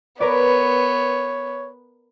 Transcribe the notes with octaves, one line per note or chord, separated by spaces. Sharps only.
B3 A#4 B4 C#5 D5